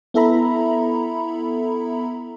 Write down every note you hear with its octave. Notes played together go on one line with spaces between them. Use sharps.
B3 E4 A4 E5 A#5 B5